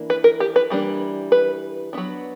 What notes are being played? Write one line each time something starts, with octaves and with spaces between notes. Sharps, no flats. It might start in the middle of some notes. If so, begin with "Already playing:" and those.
Already playing: E3 A#3 D4
B4
A#4
G4
B4
E3 G3 A#3 D4
B4
F#3 B3 D4